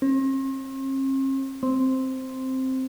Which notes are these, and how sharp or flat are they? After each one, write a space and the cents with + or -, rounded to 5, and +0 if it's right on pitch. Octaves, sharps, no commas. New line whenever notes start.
C4 +45
C4 +0